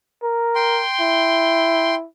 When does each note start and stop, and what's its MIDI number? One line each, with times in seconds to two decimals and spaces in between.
0.23 0.83 70
0.55 1.95 79
0.55 1.95 84
1.00 2.07 64